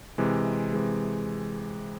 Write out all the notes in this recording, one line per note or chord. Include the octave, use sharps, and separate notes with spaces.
C3 E3 G#3
C3 E3 G#3